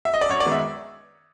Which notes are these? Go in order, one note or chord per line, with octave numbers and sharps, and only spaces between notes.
E5
D#5
D5
F#2 C#5
D5
D#3 G#3 B3
E5